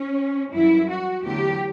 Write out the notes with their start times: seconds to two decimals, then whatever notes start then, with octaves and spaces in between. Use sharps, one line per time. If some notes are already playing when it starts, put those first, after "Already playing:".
Already playing: C#4
0.52 F#2 E3 G3 E4
0.89 F#4
1.23 E2 D3 F#3 A3 G4